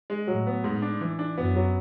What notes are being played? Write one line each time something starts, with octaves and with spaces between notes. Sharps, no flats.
G#3
A2 F#3
B3
G#2
D4
E3
D4
F#2 B3
F#3